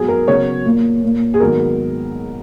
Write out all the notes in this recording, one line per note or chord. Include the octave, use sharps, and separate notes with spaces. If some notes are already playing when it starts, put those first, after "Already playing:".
Already playing: G#2 F#3 B3 G#4
A#4
C#3 F#3 B3 C#5
A#2 A#3
A#2 A#3
G#4
G#2 D#3 F#3 B3 A#4